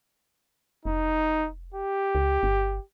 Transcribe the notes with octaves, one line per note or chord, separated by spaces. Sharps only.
F1 D#4
G4
C#2
G1